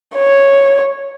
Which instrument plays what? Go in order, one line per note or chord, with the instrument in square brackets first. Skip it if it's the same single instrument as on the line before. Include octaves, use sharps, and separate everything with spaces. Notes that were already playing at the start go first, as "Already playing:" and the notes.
[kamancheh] C#5